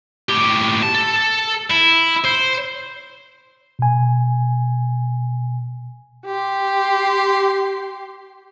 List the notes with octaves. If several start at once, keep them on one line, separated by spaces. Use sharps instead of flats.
A2 G4
A5
A4
E4
C5
B2 G#5
G4 C6